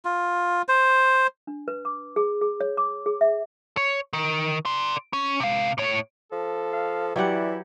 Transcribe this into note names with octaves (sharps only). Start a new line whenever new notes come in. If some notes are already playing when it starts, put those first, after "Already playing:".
F4
C5
D4
B4
D6
G#4
G#4
C#5
D6
G#4
E5
C#5
D#3
D5 C6
C#4
C3 F5
A2 C#5
F3 A4
F5
E3 F#3 E4 G4 D5 F#5